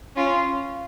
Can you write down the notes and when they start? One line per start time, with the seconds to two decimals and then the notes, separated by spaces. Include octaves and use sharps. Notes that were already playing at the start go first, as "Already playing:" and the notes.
0.16 C#4 F4